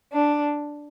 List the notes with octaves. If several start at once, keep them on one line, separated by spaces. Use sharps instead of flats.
D4